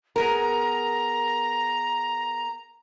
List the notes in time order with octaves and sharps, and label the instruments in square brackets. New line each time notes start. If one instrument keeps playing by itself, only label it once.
[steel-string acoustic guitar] B3 G#4 A#4 [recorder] A#5